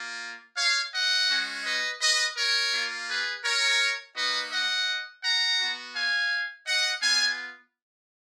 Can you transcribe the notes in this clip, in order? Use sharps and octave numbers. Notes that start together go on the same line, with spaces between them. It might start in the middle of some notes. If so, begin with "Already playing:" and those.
Already playing: A#3 F4
C#5 F5
D#5 F#5
G#3 C#4 F#4
B4 D#5
B4 D#5
A#4 C#5
A#3 F4
G#4 B4
A#4 C#5
A#3 D#4 F#4 B4 D#5
D#5 F#5
F#5 A#5
B3 F#4
F5 G#5
D#5 F#5
B3 F4 F5 G#5